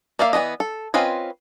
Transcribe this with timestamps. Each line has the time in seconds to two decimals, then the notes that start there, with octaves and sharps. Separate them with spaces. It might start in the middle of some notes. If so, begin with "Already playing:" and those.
0.19 A#3 D5 E5 F5
0.33 E3 B3 D4 D#5
0.60 A4
0.94 C4 C#4 F4 B4 D#5